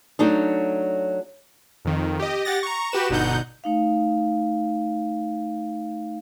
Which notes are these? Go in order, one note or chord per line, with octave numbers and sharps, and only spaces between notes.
F#3 A3 D4 D#4
F2 D#3
G4 D#5
G4 F#5 A6 A#6
A#5 C#6
F#4 G4 B4 E7
G1 B2 D3 D#4 F#5 G6
A3 D#4 F5